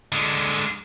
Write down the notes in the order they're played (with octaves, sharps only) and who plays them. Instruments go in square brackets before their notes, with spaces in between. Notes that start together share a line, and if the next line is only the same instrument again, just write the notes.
[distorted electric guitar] D3 G#3